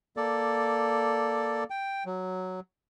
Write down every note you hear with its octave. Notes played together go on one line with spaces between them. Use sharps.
A#3 A4 D5
G5
F#3